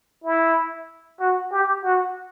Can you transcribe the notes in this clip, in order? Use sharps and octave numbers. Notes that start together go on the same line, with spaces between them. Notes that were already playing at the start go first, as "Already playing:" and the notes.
E4
F#4
G4
F#4